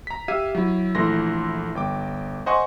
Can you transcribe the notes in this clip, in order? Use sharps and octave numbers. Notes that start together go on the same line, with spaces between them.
A#5 B6
G4 E5 F5 G#6 D#7
F#3 E4
A#1 E3 A3 E4 C6 A#6
G1 G5 D6
C5 D#5 F#5 G#5 C6 C#6